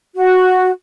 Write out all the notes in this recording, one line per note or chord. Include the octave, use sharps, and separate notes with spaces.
F#4